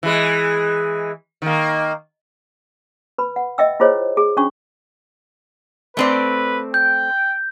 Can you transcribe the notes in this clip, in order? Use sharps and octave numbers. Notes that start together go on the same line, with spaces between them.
E3 G#3
D#3 A#3
B4 B5
F#5
D#5 E5 G5 E6
E4 F4 G#4 C5 C#5 D#5
G#4
C#4 D4 F#4 C#6
A3 C4 B4 D5
G5 G6